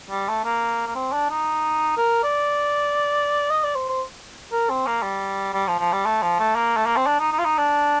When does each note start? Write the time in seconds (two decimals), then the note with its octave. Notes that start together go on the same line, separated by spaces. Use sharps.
0.11 G3
0.29 A3
0.44 A#3
0.87 A#3
0.95 C4
1.12 D4
1.30 D#4
1.97 A#4
2.23 D5
3.50 D#5
3.64 D5
3.75 C5
3.89 C5
4.52 A#4
4.70 C4
4.87 A#3
5.03 G3
5.54 G3
5.67 F3
5.79 F3
5.93 G3
6.06 A3
6.22 F3
6.39 A3
6.56 A#3
6.77 A3
6.86 A#3
6.97 C4
7.07 D4
7.20 D#4
7.32 D#4
7.39 F4
7.45 D#4
7.58 D4